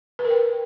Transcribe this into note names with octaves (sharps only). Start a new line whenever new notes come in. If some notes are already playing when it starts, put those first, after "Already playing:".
B4
A#4
G5